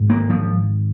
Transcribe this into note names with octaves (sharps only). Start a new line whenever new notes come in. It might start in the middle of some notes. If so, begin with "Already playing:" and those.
Already playing: G#1 G#2
A#3
F3